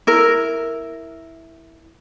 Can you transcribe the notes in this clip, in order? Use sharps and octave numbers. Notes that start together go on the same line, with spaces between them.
E4 A#4